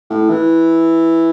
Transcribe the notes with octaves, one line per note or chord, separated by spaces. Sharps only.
A2
E3